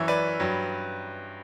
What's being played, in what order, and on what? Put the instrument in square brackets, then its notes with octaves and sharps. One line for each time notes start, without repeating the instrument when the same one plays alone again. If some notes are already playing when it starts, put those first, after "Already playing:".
Already playing: [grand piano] F#2 E3 C#5 E5
B4 D5
G2 F#3